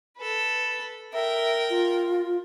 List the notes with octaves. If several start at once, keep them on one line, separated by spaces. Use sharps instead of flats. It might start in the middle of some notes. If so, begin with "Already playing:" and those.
A4 B4
A#4 E5 G5
F4